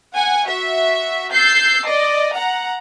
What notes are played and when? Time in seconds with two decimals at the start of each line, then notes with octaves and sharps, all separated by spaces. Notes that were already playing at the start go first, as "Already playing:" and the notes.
0.13 F#5 G#5
0.47 F#4 E5
1.32 E6 G6 A6 C7
1.86 D5 D#5
2.34 F#5 A#5